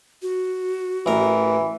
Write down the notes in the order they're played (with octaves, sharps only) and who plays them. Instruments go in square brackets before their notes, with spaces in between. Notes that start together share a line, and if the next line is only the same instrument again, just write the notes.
[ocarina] F#4
[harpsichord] A1 A#4 [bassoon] E3